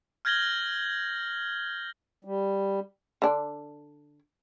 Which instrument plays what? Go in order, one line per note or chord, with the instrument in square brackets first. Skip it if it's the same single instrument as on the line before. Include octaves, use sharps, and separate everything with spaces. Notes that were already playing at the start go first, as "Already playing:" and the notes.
[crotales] F6 G6 G#6 A#6 F#7 G7
[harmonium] G3
[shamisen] D3 D4